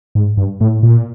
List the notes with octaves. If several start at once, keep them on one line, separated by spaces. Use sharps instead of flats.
G#2
G2
A2
A#2